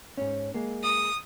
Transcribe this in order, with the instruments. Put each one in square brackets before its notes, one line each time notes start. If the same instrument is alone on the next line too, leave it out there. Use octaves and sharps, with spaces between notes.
[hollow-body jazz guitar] G#2 C#4
G#3 A#3
[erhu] D#6